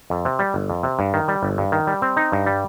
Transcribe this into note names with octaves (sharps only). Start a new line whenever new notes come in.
F2
C3
G3
G1
F2
C3
G2
D#3
G3
G1
G2
D#3
G3
C4
D#4
G2
G3